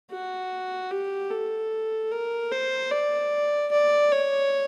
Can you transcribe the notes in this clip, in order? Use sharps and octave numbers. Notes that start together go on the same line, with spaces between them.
F#4
G4
A4
A#4
C5
D5
D5
C#5